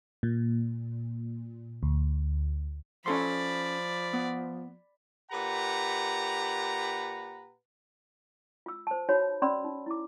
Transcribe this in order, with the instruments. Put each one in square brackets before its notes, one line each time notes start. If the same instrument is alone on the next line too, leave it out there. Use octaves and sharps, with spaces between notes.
[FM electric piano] A#2
D2
[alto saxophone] F3 [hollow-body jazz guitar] C#4 A4 C6 [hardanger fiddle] D5 B5
[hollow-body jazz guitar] B3
[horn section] A#2 G4 B4 F#5 A#5
[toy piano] F4 E6
C5 A5
D#4 F#4 C#5 B5
C#4 D5 B5 C6 E6
D#4
E4 D6